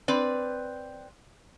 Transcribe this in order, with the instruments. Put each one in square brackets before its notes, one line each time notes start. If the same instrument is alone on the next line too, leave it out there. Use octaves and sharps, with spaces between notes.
[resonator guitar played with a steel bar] C4 B4 D5